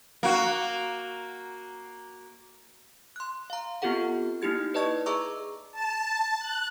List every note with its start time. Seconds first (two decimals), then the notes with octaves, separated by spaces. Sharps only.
0.23 A#3 F#4
3.16 C6 F#6
3.50 F5 A#5
3.82 B3 C4 F4 G4 A4 F#5
4.42 A#3 D#4 E4 G4 G#6
4.74 B4 D5 D#5 A5 C#6 G#6
5.06 G#4 E5 A#5 C#6 D6 E6
5.72 A5
6.39 F#6